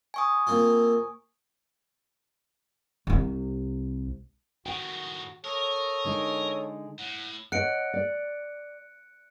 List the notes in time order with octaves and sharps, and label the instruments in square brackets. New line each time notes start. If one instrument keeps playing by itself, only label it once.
[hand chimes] G#5 C#6 D#6
[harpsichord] A#3 C4 F4
[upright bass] C2 C3
[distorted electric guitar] A2 D#3 [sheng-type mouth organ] F#4 [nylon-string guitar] G5
[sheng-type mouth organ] A4 C#5 D#6 [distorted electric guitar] A#4
[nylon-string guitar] D3 G#3 D#4
[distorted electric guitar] A2 [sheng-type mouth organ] F#5
[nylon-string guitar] C#5 D#5 F#5 [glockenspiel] F#6 C#7 D7
[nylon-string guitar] D5